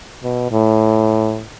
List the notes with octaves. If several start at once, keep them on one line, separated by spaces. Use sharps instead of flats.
B2
A2